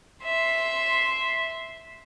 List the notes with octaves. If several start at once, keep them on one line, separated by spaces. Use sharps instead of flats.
E5 C6